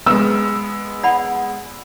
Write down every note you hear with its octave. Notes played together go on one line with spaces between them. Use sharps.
G#3 B3 E6
D5 F#5 B5